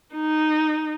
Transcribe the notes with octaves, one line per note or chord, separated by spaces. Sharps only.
D#4